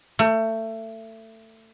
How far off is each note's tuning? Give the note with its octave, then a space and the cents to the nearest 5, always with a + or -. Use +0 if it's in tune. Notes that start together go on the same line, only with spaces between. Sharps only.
A3 +25